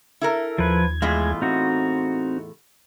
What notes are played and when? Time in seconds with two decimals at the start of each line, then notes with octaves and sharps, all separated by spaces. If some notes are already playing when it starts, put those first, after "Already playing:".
0.21 E4 A4 A#4
0.58 D#2 F3 B4 G#6
1.02 E2 A2 G#3 F4
1.42 C4 D#4 F#4